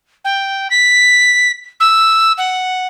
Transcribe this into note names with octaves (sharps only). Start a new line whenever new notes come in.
G5
B6
E6
F#5